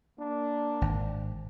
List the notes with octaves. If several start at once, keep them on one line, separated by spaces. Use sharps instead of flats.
A#3 D4
G#1